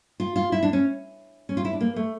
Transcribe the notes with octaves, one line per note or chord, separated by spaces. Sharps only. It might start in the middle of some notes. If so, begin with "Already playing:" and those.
F4
F4
E4
D4
C#4
C#4
F4
E4
D4
A#3
A3